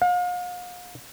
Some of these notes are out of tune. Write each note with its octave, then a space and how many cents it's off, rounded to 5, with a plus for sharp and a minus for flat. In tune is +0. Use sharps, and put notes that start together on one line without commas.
F5 +40